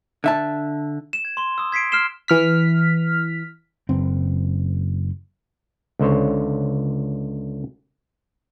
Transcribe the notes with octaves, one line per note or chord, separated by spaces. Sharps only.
D3 E5 A5
E7
G#6
C6 G7
D#6 E6
G#6 B6 C7 D7
C6 F6 F#6 C7 E7 G7
E3 F6 B6
F#1 C4
C#2 D3 C5 C#5